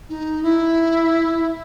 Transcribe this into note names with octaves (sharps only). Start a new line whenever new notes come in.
D#4
E4